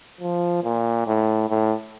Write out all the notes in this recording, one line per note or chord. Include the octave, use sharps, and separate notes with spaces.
F3
A#2
A2
A2